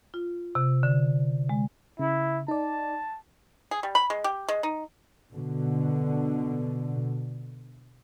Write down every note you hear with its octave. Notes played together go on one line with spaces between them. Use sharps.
F4
C3
D3
G#3
C#3 E4
D#4 D5 A5
G#4
G3
B5
G#3
G4
G#3
D#4
B2 D3